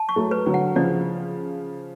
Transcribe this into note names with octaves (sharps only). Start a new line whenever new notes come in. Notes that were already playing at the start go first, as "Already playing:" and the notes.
Already playing: A5
C#6
F#3 A3
B4
D3 F#3
F#5
C#3 F3 D5